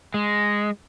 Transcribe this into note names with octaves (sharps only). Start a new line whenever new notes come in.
G#3